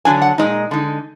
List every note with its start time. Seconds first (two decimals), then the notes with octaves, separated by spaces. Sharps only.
0.05 D3 F#3 D4 G#5
0.22 F#5
0.38 A#2 G#3 D#4 D#5
0.71 D3 G#3 D#4